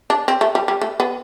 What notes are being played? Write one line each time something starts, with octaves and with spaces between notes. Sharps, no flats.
D4
C4
A3
G3
G3
A3
B3